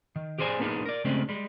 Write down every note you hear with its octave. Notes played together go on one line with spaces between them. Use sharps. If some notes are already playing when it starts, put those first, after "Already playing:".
D#3
G4 G#4 C5 D5 G#5
A#3 B3 D4 D#4 G#4
A#4 D5
C#3 G#3 A3 C4 D4 G4
G3 G#3